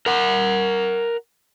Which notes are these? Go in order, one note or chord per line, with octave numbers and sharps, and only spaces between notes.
A#4 F#5